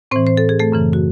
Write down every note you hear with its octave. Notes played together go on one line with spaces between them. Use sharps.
A2 E3 C4 C5
C5
A4
G#4
A3 A4
F#2 C#3 E3
F#4